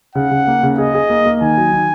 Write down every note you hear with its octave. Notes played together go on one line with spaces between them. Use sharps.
C#3 F#5
C#3
A#3
C#3
G#4 D#5
G#4
A#3
A#3
D#3 G#5
F#3
D#3